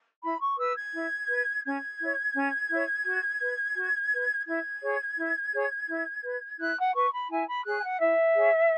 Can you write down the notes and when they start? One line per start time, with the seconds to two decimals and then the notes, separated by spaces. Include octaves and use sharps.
0.23 E4 B5
0.41 C#6
0.58 B4 E6
0.76 G#6
0.94 E4
1.28 B4
1.64 C#4 G#6
2.00 E4 C#5
2.35 C#4
2.70 E4 C#5
3.06 F#4
3.41 B4
3.77 F#4
4.12 B4
4.47 E4 G#6
4.82 G#4 C#5
5.18 E4
5.53 G#4 C#5
5.89 E4
6.23 B4
6.59 E4 F#6
6.77 F#5
6.94 B4 C#6
7.13 B5
7.30 E4 G#5
7.48 B5
7.65 G#4 C#5 F#6
7.78 G#5
7.84 F#5
8.00 E4 E5
8.36 G#4 C#5